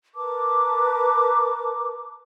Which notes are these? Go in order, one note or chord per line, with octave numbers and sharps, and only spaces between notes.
A#4 B4 A5 D6